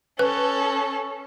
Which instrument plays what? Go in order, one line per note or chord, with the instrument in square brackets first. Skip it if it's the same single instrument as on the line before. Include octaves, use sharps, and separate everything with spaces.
[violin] C#4 A4 [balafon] B4